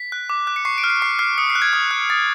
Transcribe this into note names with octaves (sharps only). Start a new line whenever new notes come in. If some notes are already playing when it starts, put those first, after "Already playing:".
Already playing: B6
F#6
D6
F#6
C#7
C#6 C7
D7
F6
C7
C#6 C7
F6 C7
D#6 C#7
C7
F#6
G#6
D#6
F#6
D#6 A6